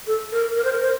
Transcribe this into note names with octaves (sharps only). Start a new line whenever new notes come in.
A4
A#4
A#4
C5
A#4
C5